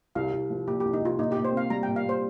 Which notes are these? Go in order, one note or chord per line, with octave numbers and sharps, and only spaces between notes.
C2 F5
C2
F3
A#2 G4
G4
C2
D#4
C2 F4
A#2 D#4
G4
A#2
C5
C4 F5
G3 A#5
G5
A#2
F5
A#2
C5